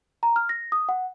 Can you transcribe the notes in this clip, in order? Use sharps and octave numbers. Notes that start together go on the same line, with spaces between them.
A#5
F6
A#6
D#6
F#5